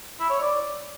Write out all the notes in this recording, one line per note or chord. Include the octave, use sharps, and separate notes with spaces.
E4
C#5
D5